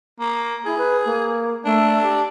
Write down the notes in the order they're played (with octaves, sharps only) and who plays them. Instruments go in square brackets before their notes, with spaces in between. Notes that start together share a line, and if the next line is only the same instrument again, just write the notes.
[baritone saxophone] A#3
[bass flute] E4 [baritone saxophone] G#4
[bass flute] B4
A#3
[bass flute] A3 [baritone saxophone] D4
[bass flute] G4